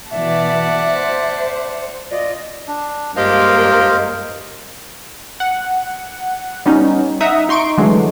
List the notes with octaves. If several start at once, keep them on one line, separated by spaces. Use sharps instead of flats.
B2 E3 D5 E5 F#5 A5
C5
F4 D5 D#5
D4
G2 G#3 A#3 F4 G4 C5 D#5 F5
F#5
G3 B3 C#4 D#4
D#4 E5 F#5 A#5 D#6
D#4 C6 C#6 D7
D3 E3 F#3 G#3 A3 D4